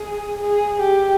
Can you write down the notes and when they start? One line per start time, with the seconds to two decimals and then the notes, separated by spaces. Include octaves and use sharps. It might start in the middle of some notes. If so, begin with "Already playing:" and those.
Already playing: G#4
0.39 G#4
0.81 G4